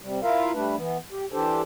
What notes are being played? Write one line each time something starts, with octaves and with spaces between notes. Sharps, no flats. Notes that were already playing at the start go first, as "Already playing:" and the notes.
C3 G3
E4 F4 A#4 E5 F5
G3 A3 D4 B4
E3 B3
G4
E3 D4 G4 A4 C5